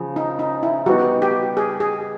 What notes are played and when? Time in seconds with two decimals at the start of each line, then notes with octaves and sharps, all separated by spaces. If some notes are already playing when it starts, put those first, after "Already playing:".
Already playing: C#3 F3
0.16 D#4
0.39 D#4
0.63 E4
0.86 G3 B3 D#4 F#4
1.22 G4
1.57 G#4
1.80 G#4